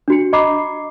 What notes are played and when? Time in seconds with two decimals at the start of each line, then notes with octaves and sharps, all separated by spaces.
0.08 D4 F#4 C#7
0.33 D#5 A#5 B5 D6 C7